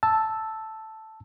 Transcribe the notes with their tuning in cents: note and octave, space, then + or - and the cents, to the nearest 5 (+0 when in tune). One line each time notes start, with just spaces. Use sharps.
A5 +0 E6 +0